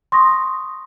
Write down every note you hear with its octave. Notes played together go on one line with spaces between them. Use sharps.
C6 C#6 D#6 A#6